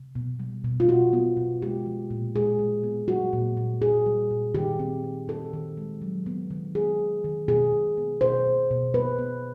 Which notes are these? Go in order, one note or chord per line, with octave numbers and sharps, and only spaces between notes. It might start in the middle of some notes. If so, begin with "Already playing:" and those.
Already playing: C3
B2
G3
B2
F4
B2 F#4
B3
B2
G#3 G4
F3
A#2
G#3 G#4
G#3
B3
G3 F#4
A#2
A#2
A#2 G#4
G3
A#2
D#3 G4
C4
C4
D#3 A4
D#3
G#3
F#3
B3
D#3
B3 G#4
D#3
D#3
B2 G#4
B2
B3
B2 C5
B2
B2
B3 B4
B3